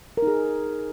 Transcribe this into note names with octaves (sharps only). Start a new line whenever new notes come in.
D#4 G#4 A#4